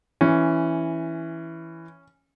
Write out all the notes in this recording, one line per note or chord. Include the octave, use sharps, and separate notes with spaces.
E3 C#4